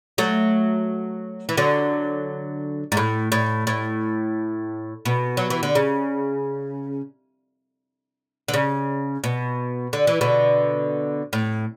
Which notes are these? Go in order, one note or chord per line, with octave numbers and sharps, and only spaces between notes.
F#3 A3
E3
D3 F#3
G#2
A2
A2
A2
B2
F#3
E3
D3
C#3
D3
C#3
B2
D3
E3
B2 D3
A2